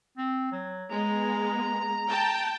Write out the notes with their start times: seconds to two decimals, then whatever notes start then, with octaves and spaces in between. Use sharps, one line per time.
0.17 C4
0.52 F#3
0.90 G#3 B3 A#5
2.09 G5 A5